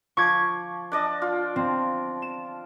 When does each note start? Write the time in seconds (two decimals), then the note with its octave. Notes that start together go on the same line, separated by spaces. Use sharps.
0.17 F3 C#6 D6 G#6
0.92 D4 D5 D#5
1.22 F4
1.56 C4
2.22 E7